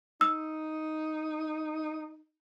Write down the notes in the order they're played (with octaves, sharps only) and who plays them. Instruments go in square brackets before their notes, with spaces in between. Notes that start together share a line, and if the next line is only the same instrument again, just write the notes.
[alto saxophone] D#4 [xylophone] E6